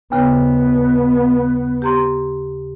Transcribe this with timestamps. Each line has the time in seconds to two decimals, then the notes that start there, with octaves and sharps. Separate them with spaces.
0.12 D#2 C#3 B3
1.82 G4 A#5 C6